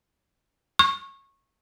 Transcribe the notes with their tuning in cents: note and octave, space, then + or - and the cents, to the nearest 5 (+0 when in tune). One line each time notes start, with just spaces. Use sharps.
C#6 -20